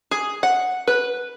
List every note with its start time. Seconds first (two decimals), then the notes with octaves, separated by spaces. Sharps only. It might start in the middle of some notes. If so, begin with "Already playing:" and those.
0.11 G#4
0.43 F#5
0.87 B4